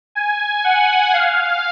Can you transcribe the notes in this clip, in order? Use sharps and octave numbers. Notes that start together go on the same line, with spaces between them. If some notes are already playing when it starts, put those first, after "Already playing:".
G#5
F#5
F5